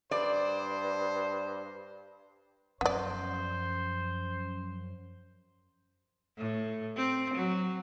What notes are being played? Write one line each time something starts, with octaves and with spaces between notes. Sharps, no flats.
G2 C5 D5
F#2 F3 B3 C5 D5
A2
C4
F#3